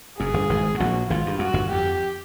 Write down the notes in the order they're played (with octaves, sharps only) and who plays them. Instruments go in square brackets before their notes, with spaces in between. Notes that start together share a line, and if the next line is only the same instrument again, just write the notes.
[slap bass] F#1 F#2 [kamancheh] G#4
[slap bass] G1 G2
G#1 G#2
A2
[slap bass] A#1 A#2 [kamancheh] F#4
[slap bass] G#1 G#2 [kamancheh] F4
[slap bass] G2
[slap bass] F#2 [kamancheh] F#4
[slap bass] G1 G2
[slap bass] F2 [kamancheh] G4